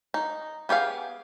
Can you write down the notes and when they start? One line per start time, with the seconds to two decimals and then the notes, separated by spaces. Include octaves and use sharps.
0.14 D#4
0.69 B3 G4 G#4 F5